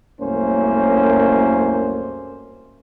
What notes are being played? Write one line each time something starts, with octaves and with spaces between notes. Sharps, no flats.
C2 F#2 A3 A#3 C#4 C5